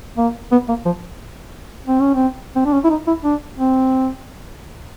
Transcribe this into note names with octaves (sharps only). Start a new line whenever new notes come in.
A#3
B3
A#3
F3
C4
C#4
C4
C4
D4
C#4
E4
D#4
E4
D4
C4